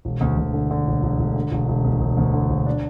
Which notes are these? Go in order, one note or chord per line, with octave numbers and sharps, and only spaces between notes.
E1
D2
D2
D3
D3
E1
E1
E1
D3
E1
E1
D2
E1
D2
D3
E1
D4